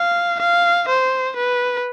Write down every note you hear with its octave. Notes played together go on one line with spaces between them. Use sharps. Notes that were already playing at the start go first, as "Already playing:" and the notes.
Already playing: F5
F5
C5
B4